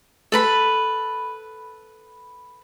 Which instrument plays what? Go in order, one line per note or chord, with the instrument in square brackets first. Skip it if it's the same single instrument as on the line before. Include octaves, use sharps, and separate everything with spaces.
[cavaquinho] A4 B4 B5